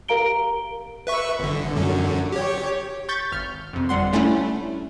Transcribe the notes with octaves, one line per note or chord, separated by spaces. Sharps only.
G4 A#4 F5 A#5 D7 G7
B4 E5 C#6
G1 D3
F#2 D3 F#3
G4 C#5
C#6 G6 A6 B6
G#1 F6
F2 C3
G1 F2 G3 F#5 C6
G3 A3 C#4 D4 E4